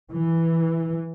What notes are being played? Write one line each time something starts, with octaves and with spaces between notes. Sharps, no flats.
E3